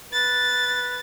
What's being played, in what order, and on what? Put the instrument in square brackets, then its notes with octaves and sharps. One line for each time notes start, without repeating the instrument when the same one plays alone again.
[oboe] B4 [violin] A6